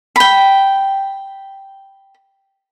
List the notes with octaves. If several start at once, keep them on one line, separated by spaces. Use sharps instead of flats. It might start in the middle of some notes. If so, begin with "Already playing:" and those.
G5 B5